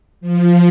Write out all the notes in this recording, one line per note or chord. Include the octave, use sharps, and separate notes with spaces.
F3